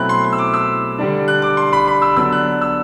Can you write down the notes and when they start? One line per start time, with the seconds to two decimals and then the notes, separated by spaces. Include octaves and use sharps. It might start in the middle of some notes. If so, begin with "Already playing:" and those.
Already playing: B2 F#3 A3 C4 E4 B5 F#6
0.09 C6
0.24 C6
0.33 E6
0.38 D6
0.54 E6
0.98 D3 G3 D4
1.28 F#6
1.42 D6
1.57 C6
1.73 B5
1.88 B5
2.02 E6
2.16 D3 F#3 B3 D4 E6
2.32 F#6
2.61 E6